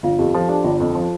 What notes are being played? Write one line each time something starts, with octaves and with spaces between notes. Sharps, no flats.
G1 F4 F5
F2 G4
F3 A4
D4 G4
G1 F4
F2
F3